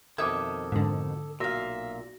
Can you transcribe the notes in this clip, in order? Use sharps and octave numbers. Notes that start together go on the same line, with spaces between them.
F2 B2 D#3 A4 E5 D6 D#6 G#6
G#2 D3
B1 A#2 F#4 E5 F5 A#6